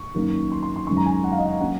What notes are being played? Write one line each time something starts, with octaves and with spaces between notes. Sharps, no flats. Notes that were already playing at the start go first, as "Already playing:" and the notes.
Already playing: C#6
F#2 D#3 A#3 C#4
C6
C6
C6
F#2 D#3 G#3 C#4 C#6
A#5
G#5
F#5
F5
D#5
F5
F#3 A#3 C#4 F#5